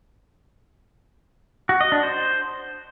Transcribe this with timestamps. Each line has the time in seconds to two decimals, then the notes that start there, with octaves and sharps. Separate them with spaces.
1.69 F#4
1.81 D#5
1.92 D4
2.03 C5